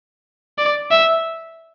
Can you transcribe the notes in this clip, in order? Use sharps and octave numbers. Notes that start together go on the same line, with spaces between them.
D5
E5